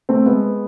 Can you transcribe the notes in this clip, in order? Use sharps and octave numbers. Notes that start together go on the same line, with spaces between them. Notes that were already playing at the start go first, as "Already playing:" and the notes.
A3 C4
G#3 B3